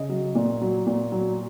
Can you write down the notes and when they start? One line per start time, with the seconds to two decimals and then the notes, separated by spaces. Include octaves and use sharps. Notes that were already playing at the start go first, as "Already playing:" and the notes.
Already playing: C#3 D#5
0.09 F#3
0.35 A#2
0.61 F#3
0.87 A#2
1.12 F#3